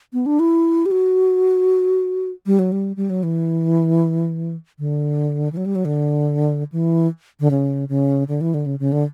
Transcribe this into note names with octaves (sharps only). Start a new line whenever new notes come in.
B3
D4
E4
G4
F#4
G3
F#3
G3
G3
F#3
E3
D3
E3
F#3
G3
F#3
D3
E3
D3
C#3
C#3
D3
E3
D3
C#3
C#3
D3